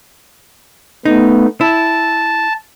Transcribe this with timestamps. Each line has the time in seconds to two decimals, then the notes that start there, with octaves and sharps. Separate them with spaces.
1.05 A3 B3 D#4
1.61 E4 A5